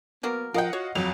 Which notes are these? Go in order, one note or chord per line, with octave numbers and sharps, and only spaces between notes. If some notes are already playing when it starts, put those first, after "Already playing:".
F#3 A#3 B3 A#4
F3 F4 A#4 D#5 F#5 G5
F#4 C#5
G1 F2 F#3 F7